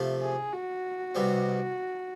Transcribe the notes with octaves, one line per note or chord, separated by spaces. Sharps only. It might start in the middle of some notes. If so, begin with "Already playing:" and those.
Already playing: C3 F3 A3
G#4
F#4
C2 B2 G3 C4